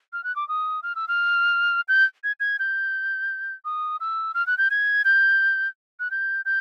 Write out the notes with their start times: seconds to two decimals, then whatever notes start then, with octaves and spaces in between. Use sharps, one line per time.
0.13 F6
0.24 F#6
0.36 D6
0.48 D#6
0.83 F6
0.95 E6
1.08 F6
1.88 G6
2.24 G#6
2.40 G#6
2.59 G6
3.65 D#6
4.00 E6
4.34 F6
4.47 F#6
4.58 G6
4.70 G#6
5.05 G6
6.00 F#6
6.11 G6
6.45 G6